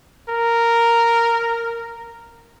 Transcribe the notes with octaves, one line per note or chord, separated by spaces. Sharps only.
A#4